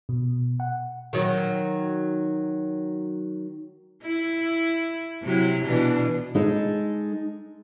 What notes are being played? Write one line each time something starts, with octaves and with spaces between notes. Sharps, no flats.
B2
F#5
D#3 F#3
E4
C3 F#3 E4
B2 E3 D4
G#3 D#4 A4